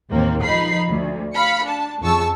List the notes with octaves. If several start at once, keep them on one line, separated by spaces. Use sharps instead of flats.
A1 D#2 A#3 C4
F3 D#4 B5 C7
D2
F5 B5 C#7
D4 A5
F2 C#3 A5 C#6 E6